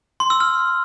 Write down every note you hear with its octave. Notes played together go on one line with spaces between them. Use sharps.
C6
E6
F6